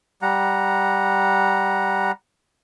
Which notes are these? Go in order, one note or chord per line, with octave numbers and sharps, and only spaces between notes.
G3 F#5 A#5